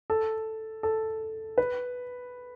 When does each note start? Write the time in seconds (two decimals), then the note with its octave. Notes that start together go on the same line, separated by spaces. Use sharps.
0.10 A4
0.83 A4
1.58 B4